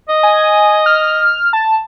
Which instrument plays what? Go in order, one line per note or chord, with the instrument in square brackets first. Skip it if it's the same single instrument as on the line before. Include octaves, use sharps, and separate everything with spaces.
[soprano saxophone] D#5
[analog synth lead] G#5
F6
A5